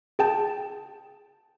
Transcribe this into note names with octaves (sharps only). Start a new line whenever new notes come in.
G#4 G5 A5